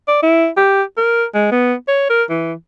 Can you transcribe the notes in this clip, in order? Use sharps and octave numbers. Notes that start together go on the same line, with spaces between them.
D5
E4
G4
A#4
G#3
B3
C#5
A#4
E3